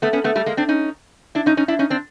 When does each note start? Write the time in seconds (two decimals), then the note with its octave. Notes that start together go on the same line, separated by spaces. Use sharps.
0.02 A3 B3
0.13 B3 C#4
0.24 A3 B3
0.35 G3 A3
0.46 G#3 A#3
0.57 C4 D4
0.68 C#4 D#4
1.35 D4 E4
1.46 C#4 D#4
1.57 C#4 D#4
1.68 D4 E4
1.79 C#4 D#4
1.90 C4 D4